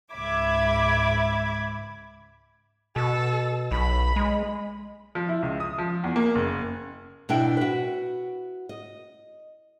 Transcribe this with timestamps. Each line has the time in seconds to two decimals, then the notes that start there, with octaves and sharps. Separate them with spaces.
0.12 C#2 G#2 E5 B5 D6 G#6
2.96 B2 A4
3.71 B1 B5
4.16 G#3
5.15 F3
5.29 E4
5.43 C#2
5.60 D#6
5.78 F3
6.04 E2
6.16 A#3
6.35 F#1
7.29 B2 D4 E4 G5
7.57 F#4 B4
8.69 D#5